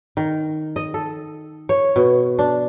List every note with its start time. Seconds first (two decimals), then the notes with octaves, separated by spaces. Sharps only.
0.17 D#3
0.76 D#5
0.94 A4
1.69 C#5
1.96 B2
2.39 D4